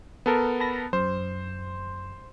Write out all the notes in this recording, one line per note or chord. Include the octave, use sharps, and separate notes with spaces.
B3 A4 A#4
A5 B5 A#6
F#2 C5